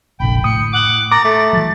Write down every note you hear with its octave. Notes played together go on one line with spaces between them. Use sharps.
F1 A#1 D3 G5 B5
A2 D#6 C#7
F#5 D6
A#5 D6 A6
A3
E3 F#3